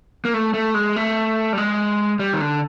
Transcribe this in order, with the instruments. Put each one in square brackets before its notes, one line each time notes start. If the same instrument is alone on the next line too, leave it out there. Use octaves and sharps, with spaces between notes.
[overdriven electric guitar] A#3
A3
A3
G#3
A3
G3
G#3
G3
D#3
D3